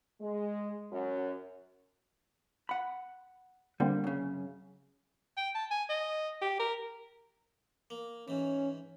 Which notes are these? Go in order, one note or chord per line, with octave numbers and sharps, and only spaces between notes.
G#3
F#2
F#5 B5
D3 G3 A#3 C4
F#2 C#3
G5
A5
G#5
D#5
G4
A#4
A#3
G#2 E3 C#4